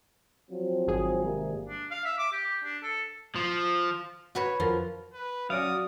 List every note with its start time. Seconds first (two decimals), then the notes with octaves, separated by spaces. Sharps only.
0.50 F3 F#3 C4
0.87 G#1 G#4
1.23 C3 G3 A#3
1.69 D4
1.91 F5
2.05 E5
2.18 D6
2.32 G4
2.64 D4
2.83 A4
3.36 F3
4.35 F#4 B4 C#5
4.60 F2 F3 A#4 B4
5.14 B4
5.50 F#3 C#4 F#4 D5 F5 D#6